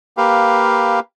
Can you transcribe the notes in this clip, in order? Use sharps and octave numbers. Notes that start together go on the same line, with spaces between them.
A#3 G4 B4 F5